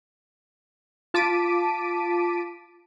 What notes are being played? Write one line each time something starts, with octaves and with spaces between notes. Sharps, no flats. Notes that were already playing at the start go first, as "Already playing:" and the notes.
F4 A5 D6 B6 D7 D#7